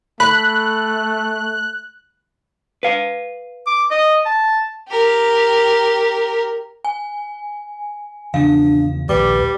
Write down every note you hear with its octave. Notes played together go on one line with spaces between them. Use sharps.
A3 B5 F#6
B4 F5
D6
D#5
A5
G4 A#4
G#5
E2 C#3 F3 D4 F5
A#1 D#2 G3 B4 D6